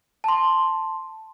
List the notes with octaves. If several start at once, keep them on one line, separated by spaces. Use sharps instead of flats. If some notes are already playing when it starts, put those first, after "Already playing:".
A5 C6